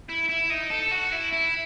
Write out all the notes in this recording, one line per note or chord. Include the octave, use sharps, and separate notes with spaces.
E4
E4
D#4
A4
F#4
E4
E4